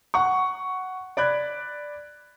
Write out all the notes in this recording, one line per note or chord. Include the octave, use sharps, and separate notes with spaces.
F#5 C#6
D5 B5 F#6 G#6